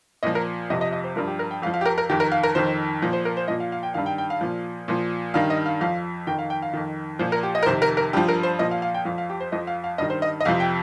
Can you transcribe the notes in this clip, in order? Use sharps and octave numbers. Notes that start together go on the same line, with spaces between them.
A#2 F3 D#5
A#4
F2 C3 F3 D#5
D#5
D#5
C5
G2 F3 A#4
G4
A#4
G5
F2 F3 F5
F5
G4
A#4
A#4
F2 D#3 G4
A#4
F5
A#4
F2 D#3 C5
A#2 F3
C5
A#4
C5
A#2 F3 D#5
F5
F5
G5
G2 D#3 F5
G5
G5
F5
A#2 F3
A#2 F3
G2 D#3 F5
D#5
F5
F2 F3 F5
F2 D#3 G5
F5
G5
F5
F2 D#3
A#2 F3 C5
A#4
G4
D#5
A#4
F2 C3 D#3 C5
A#4
A#4
G2 F3 G4
A#4
C5
A#2 F3 D#5
F5
F5
G5
F2 F3 F5
F5
G4
C5
F2 F3 D#5
F5
F5
G2 D#3 D#5
C5
D#5
D#5
F2 C3 F3 F5
G5